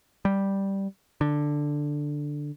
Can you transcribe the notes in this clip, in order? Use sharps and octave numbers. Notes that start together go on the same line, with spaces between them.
G3
D3